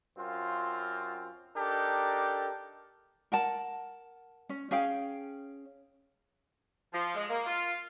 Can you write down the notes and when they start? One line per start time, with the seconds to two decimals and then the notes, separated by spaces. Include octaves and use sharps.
0.18 F#2 C4 F4
1.57 D4 D#4 G4 A4 A#4
3.32 A#4 F#5 A5
4.49 C#4
4.71 C#4 G#4 F5 G5
6.93 F3
7.15 G#3
7.29 A#3
7.46 F4